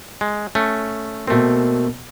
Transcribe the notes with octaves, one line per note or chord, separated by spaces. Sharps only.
G#3
A3 C#4
B2 A3 A#3 C4